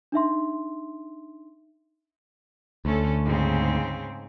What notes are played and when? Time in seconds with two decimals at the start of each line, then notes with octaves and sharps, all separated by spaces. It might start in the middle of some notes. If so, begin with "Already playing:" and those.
0.12 D4 D#4 E5 C6
2.85 D2 A3 C#4 A4
3.25 G#2 C#3 C4